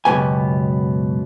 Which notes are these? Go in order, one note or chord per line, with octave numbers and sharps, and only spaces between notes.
C#2 F#2 B2 B3 G4 G#5